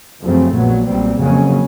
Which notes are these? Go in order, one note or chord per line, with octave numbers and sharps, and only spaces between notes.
F#2 C#3 F3 A3 C4
A#1 A#2 F#3 B3
B1 A#2 G3 C4
F2 C#3 F#3 A#3 C#4